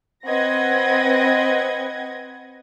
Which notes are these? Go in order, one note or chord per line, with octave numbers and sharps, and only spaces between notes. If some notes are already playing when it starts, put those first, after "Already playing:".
C4 B4 D#5 F#5 G#6 A#6